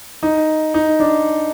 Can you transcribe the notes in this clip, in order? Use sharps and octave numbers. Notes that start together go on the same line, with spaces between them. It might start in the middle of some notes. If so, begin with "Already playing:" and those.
D#4
D#4
D4